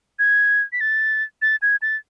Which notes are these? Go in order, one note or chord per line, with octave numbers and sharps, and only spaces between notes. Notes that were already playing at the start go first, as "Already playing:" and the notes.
G#6
B6
A6
A6
G#6
A6